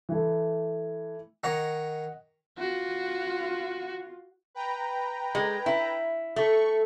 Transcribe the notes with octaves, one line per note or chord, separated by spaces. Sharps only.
E3 A3
D#3 C#5 D#5 F#5 A#5
F4 F#4
B4 G5 A#5
G#3
E4
A3 C#6